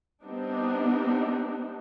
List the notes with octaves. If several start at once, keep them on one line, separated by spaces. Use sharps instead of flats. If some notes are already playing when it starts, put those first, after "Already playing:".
G3 B3 C4 D4 D#4